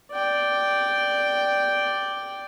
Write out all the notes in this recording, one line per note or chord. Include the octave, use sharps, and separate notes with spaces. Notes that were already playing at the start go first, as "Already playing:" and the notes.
D5 G5